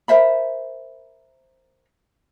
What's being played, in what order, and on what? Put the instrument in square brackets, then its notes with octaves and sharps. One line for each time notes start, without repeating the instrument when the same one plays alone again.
[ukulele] A#4 C5 E5 B5